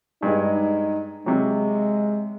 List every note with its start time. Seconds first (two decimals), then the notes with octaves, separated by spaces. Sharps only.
0.23 G2 G#3 D#4
1.26 C3 F#3 G#3